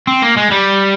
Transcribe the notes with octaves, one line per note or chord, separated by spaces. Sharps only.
C4
A#3
G#3
G3